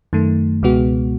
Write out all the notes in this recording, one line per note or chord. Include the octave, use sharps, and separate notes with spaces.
F#2 D#3 A3
C#2 B2 G#3 B3 F#4